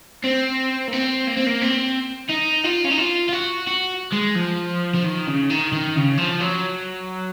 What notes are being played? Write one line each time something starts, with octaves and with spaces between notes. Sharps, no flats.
C4
A#3
C4
A#3
C4
A#3
C4
D#4
F4
C#4
D#4
F4
F4
F#4
F#4
G#3
F3
F3
D#3
C#3
D#3
D#3
C#3
F3
F#3